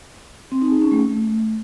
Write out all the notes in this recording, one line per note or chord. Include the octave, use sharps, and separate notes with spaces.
C4
D#4
G#4
C#4
A3